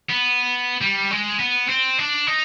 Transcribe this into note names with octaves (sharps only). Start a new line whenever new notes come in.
B3
G3
G#3
B3
C4
D4
D#4